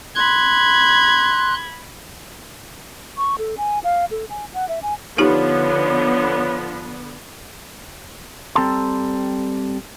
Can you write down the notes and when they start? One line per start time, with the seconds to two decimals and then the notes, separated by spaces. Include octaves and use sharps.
0.16 B5 C6 F#6 G#6
3.18 C#6
3.39 A4
3.58 G#5
3.84 F5
4.11 A4
4.30 G#5
4.54 F#5
4.69 E5
4.83 G#5
5.18 D3 F3 B3 D#4 G4 C#5
8.55 G3 C4 A4 A5 A#5 C6